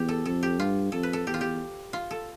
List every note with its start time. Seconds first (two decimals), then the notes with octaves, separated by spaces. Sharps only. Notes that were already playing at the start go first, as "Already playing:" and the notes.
Already playing: E2 G4
0.08 A4
0.25 F2 A4
0.43 G4
0.59 G2 F4
0.92 F2 A4
1.03 B4
1.13 A4
1.27 E2 G4
1.34 F4
1.41 G4
1.93 F4
2.11 A4